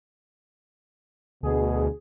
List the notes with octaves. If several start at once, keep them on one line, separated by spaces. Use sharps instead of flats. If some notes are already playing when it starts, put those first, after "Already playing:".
D2 B2 G#4